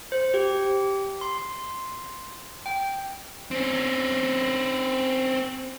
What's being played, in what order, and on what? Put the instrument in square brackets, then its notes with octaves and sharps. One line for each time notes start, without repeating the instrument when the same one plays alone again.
[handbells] C5
G4
C6
G5
[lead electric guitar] C4 C#4